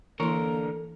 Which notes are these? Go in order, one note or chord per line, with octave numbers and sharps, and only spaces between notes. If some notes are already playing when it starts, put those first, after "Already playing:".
D3 E3 A#3 E4 A4 A#4 C6